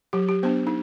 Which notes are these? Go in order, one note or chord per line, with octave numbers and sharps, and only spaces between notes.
F#3 G4
G4
B3 D4 C5
D#4